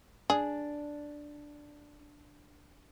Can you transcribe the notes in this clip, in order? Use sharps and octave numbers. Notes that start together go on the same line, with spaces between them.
D4 G#4